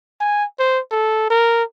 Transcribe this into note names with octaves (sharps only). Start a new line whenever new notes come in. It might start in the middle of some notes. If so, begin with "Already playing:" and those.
G#5
C5
A4
A#4